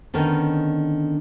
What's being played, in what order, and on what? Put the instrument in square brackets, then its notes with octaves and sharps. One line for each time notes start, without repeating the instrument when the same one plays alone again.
[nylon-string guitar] D3 D#3 B3 C#4 D#4